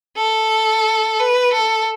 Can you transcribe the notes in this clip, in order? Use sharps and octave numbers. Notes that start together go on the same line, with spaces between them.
A4
B4
A4